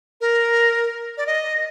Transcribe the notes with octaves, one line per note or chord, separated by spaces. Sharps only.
A#4
D5
D#5